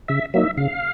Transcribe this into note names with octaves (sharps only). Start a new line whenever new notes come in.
C#3 E5
F#3 A#3 D#4 E5
C#3 F5